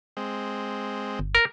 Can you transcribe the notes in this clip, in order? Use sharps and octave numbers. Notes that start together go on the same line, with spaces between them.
G#3 C4
G1
A#4